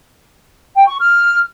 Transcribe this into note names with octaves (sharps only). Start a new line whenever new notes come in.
G5
C#6
F6